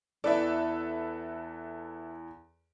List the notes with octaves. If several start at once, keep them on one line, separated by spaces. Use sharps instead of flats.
E2 E3 A4 B4 D5 E5